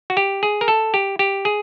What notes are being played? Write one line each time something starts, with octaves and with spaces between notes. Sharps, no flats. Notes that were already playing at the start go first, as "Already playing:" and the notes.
F#4
G4
G#4
A#4
A4
G4
G4
G#4